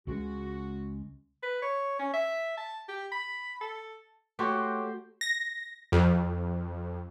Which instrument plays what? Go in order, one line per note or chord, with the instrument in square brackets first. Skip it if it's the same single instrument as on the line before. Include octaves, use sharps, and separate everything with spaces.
[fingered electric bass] C#2 C#3 G#3 [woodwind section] F#4
[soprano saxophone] B4
C#5
C#4
E5
A5
G4
B5
A4
[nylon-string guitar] A3 [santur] F#4 C5 [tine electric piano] G4 C#5
[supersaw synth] A#6
F2